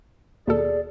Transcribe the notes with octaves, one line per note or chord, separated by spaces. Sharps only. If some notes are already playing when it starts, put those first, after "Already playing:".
D#2 B2 G#4 A4 D5